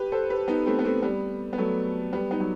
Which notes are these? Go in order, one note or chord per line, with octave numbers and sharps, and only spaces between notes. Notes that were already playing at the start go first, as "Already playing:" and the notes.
Already playing: G4 B4
A4 C5
G4 B4
B3 D#4
A3 C4
B3
A3 C4
G3 B3
B3
F#3 A3
G3 B3
B3 D#4
F#3